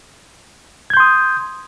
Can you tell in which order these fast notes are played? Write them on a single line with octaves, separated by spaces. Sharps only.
G#6 G6 C6 D#6